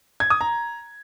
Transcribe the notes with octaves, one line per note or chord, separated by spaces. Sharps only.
G#6
D#6
A#5